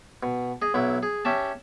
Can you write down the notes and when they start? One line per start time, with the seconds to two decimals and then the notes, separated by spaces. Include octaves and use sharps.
0.23 B2
0.62 G#4 D#5
0.74 B1 F#3 E4
1.03 G#4
1.25 C#4 G4 E5 A5